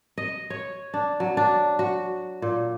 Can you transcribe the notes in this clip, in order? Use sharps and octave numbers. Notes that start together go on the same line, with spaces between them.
D#5
C#5
D4
F#3
D4
F#4
A#2